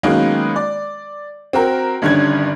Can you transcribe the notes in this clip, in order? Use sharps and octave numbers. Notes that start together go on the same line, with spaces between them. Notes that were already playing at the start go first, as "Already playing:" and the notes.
D#3 F#3 G#3 A#3 B3 C#4
D5
C4 F#4 A#4
G1 G2 D3 D#3 C#4 G#6